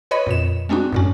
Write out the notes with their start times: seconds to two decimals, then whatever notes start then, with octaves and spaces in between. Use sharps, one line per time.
0.11 B4 C#5 D#5 B5
0.27 F2 A#2 E7
0.69 G#3 C4 D4 D#4 F#4
0.93 F#2 A2 C#4